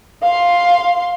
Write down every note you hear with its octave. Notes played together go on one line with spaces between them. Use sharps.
F5 C6